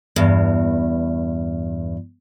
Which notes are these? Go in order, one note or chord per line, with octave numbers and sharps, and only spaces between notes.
E2 G2